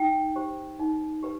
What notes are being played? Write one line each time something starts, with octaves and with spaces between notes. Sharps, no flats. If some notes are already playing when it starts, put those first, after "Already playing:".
Already playing: D#4 G5
G4 C5
D#4
G4 B4